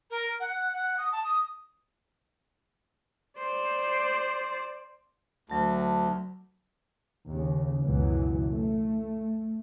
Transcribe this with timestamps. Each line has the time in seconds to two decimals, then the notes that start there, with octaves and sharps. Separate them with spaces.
0.10 A#4
0.40 F#5
0.73 F#5
0.97 D#6
1.12 A5
1.24 D#6
3.39 C5 D5
5.50 D2 F#3 A5
7.29 D#2 C#3
7.81 C#2 F#2 B2 E3 F#3
8.47 A3